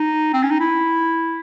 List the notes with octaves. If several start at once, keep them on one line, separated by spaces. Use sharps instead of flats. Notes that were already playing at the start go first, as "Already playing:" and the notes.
Already playing: D#4
C4
C#4
D#4
E4